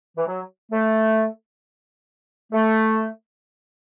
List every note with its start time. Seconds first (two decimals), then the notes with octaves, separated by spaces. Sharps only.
0.17 E3
0.27 F#3
0.72 A3
2.52 A3